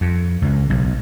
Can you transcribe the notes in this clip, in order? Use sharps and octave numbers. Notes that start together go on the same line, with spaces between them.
F2
C#2
B1